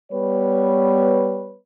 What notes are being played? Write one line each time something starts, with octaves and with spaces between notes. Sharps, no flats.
G3 B3 B4 C#5